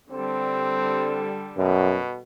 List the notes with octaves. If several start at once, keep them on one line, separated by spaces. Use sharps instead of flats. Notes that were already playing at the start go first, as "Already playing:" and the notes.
D3 G3 C4 A4
F#2 B2